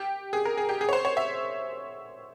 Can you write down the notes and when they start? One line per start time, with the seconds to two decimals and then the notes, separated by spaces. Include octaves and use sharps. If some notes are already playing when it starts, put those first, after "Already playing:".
Already playing: G4
0.33 G#4
0.45 A#4
0.57 G#4
0.69 G4
0.81 G#4
0.89 C#5
0.93 C5
1.05 C#5
1.17 E5